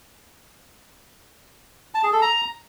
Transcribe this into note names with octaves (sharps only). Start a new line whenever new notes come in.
A5
G#4
A4
A#5